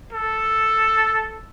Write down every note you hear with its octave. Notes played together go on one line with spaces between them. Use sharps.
A4